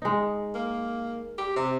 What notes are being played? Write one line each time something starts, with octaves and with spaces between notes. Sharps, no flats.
G#3 D#4
A#3
G4
C3